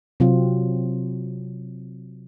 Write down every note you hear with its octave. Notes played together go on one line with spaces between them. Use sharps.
C3 F#3 C4 F4